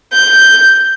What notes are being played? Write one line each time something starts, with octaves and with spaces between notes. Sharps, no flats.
G6